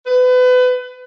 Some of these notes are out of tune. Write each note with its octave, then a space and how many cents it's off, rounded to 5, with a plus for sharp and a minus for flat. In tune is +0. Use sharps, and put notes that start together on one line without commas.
B4 +30